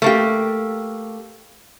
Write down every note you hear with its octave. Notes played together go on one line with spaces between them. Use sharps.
A3 A#3 G4